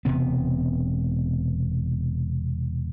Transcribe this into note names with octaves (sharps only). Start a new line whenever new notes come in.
E1 C3 B3